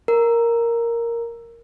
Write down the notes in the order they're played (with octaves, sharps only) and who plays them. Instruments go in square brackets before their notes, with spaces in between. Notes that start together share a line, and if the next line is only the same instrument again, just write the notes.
[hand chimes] A#4